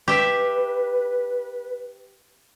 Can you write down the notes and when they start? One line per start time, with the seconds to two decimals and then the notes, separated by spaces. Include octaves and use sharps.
0.08 G4 B4 E5